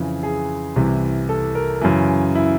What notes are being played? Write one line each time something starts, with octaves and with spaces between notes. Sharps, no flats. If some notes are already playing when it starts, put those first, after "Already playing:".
Already playing: F2 C#3 E3
G#4
C2 C3 E3
A4
A#4
F#2 C#3 E3
E4